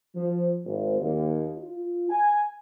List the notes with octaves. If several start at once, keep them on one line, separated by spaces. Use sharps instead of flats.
F3
G#1
D#2
F4
G#5